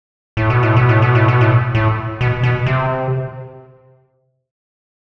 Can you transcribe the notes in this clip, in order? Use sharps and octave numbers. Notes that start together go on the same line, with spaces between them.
A2
B2
A2
B2
A2
B2
A2
B2
A2
A2
B2
B2
C3